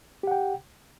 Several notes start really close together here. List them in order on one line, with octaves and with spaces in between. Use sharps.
G4 F#5 G5